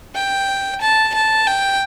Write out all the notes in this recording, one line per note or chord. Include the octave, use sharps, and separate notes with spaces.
G5
A5
A5
G5